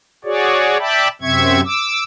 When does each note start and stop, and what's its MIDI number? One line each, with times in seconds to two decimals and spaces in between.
0.25 0.78 66
0.25 0.78 68
0.25 0.78 73
0.25 0.78 74
0.79 1.08 74
0.79 1.08 76
0.79 1.08 79
0.79 1.08 81
0.79 1.08 83
1.22 1.61 42
1.22 1.61 48
1.22 1.61 60
1.22 1.61 76
1.22 1.61 85
1.22 1.61 92
1.64 2.04 86
1.64 2.04 88